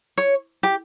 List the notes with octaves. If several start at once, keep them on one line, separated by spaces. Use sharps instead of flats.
C#5
G4